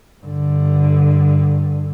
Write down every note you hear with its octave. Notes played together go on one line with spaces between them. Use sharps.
G2 D3